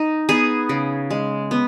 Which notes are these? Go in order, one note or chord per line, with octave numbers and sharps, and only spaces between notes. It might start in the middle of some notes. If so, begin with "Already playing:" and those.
Already playing: D#4
B3 G#4
C#3
G#3
B3